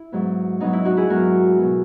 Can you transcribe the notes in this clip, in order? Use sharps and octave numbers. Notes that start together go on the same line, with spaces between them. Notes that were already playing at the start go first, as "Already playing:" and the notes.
Already playing: E4
G#2 F#3 B3
G#2 F#3 B3 D#4
E4
D#4 F#4
E4 G#4
G#2 F#3 B3 F#4 A#4
B2 F#3 B3